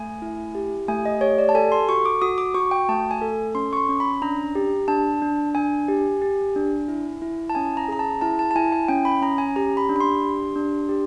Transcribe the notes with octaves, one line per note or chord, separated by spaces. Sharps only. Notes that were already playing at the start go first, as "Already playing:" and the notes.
Already playing: A3 G#5
E4
G4
A3 G#5
D#5
G4 C#5
D5
A5
A4 G#5
C6
F#4 C#6
D6
F#4 D#6
D6
F#4 C#6
G5
A3 A5
G#5
A4
C#4 C6
C#6
C6
C#4
B5
D4 A#5
G4
D4 A5
D4
D4 G#5
G4
G4
D4
E4
E4
A5
C#4 G#5
A#5
G#4 A#5
A5
E4 A5
A5
A5
E4 G#5
G#5
C#4 G5
B5
C#4 A#5
G#5
G4 A#5
B5
D4
B5
C6
G4
D4
G4